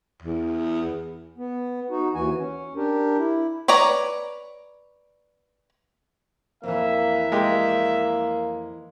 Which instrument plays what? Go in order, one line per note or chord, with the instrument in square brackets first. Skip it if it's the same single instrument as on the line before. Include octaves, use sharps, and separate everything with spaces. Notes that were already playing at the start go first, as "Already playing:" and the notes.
[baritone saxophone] E2
[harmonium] B3
D#4 F#4
D#2 E3 F#4 G#5
C#4
D4 G4 A#4
E4
[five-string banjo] B4 C#5 D5 A#5
[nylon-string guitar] F2 E3 [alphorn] A#3 [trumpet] E5
[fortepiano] G#3 G4 [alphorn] A#3